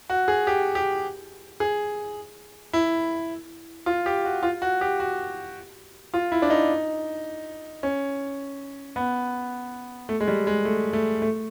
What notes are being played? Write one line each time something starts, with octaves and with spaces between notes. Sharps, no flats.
F#4
G#4
G4
G4
G#4
E4
F4
G4
F#4
F4
F#4
G4
F#4
F4
E4
D4
D#4
C#4
B3
A3
G#3
G3
G#3
A3
A3
A3